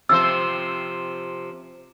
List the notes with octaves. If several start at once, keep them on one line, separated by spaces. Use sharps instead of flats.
C3 F3 C5 E6